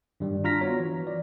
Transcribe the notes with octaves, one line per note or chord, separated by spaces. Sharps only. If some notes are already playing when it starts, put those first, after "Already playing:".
G2 D#3 G3
D4 F4 A#5 F6 A#6 B6
B3 F#4 C#5
E3
D5